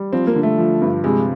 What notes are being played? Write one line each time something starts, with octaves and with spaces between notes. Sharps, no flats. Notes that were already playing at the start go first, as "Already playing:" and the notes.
Already playing: G3
F3 C4
A#3
D3
A3
F3
G2
C3 G#3